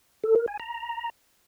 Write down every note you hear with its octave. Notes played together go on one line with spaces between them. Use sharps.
A4
A#4
G#5
A#5